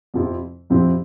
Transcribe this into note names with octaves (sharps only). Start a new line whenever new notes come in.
F2 C3 F3 C4 E4
F2 C3 F3 C4 E4